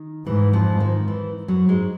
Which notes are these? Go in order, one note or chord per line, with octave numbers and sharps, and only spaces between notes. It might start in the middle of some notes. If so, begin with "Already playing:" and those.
Already playing: D#3
G#2 E3
F2 F3
D#3
E3
F#2 F#3
G#2 G#3